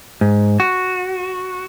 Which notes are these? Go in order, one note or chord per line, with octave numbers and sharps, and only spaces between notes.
G#2
F#4